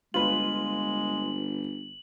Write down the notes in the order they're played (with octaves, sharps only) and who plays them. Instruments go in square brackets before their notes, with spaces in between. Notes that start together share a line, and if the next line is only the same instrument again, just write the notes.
[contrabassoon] G1 [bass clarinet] G#3 [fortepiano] F4 B4 [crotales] F#7